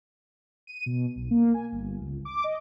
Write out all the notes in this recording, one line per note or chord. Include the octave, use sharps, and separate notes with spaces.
D#7
B2
B1
A#3
G#5
G1
C#2
D6
D#5